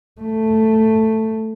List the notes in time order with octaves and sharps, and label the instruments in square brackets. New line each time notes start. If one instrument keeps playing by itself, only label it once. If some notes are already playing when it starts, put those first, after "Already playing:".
[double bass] A3